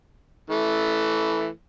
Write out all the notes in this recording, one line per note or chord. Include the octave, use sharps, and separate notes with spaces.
E3 A3